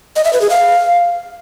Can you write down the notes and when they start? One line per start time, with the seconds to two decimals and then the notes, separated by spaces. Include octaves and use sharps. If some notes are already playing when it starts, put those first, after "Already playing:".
0.16 D#5
0.25 E5
0.33 B4
0.41 G#4
0.50 F5